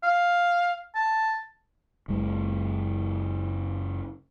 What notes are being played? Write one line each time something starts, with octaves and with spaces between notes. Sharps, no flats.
F5
A5
F#1 F#2 G#3